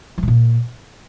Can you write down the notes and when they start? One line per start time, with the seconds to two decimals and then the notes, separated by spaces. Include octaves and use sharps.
0.18 E3
0.23 C3
0.28 A#2